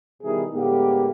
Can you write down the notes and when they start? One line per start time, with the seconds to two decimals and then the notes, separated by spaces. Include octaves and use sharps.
0.23 B2 D#3 G3 E4 G#4 A#4
0.53 A2 D3 G#3 A#3 B3 G4